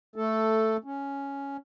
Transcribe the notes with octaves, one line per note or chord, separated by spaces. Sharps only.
A3 A4
C#4